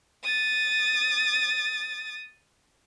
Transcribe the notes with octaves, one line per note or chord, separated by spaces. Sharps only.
D#6 A6